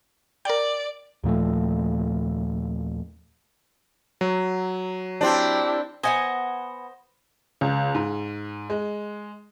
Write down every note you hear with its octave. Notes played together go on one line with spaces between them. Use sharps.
A#4 D5 G5
D#2 A#2 F3 A3
F#3
C4 D4 E4 G4 A5
B3 C5 D#5 F#5 G#5
C#2
G#2
G#3